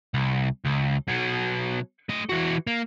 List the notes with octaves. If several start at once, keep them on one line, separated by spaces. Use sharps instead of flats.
C2
C#2
B2 F#3
A3 D#5
E3 F#4
A#3